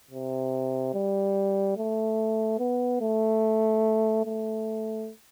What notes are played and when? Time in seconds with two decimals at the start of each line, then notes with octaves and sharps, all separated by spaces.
0.11 C3
0.94 G3
1.77 A3
2.59 B3
3.01 A3
4.26 A3